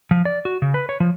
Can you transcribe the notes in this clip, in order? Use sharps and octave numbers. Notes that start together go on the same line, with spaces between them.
F3
D5
F#4
C#3
B4
C#5
F3